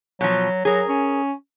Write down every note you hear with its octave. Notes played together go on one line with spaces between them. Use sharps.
B2 F3 F#3
F#3 G#4 A#4
C#4